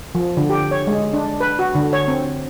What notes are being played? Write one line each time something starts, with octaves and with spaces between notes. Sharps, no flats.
F3
D3
G4
C#5
G#3
D4
B4
F#4
D3
C#5
C4